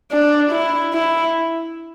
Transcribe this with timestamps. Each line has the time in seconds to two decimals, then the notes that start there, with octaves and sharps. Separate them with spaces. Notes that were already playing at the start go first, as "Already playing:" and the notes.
0.11 D4
0.52 E4
0.93 E4